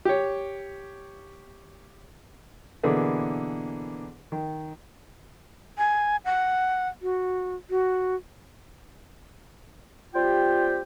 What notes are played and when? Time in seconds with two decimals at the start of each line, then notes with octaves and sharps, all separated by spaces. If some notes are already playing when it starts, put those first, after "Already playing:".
0.05 G4 C#5
2.83 B2 D3 E3 A#3 G#4 B4
4.32 D#3
5.78 G#5
6.25 F#5
7.02 F#4
7.70 F#4
10.15 G3 C4 F4 G4 G5